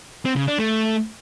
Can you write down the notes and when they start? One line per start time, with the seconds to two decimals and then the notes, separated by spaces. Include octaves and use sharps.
0.25 C4
0.36 C#3
0.47 D4
0.59 A3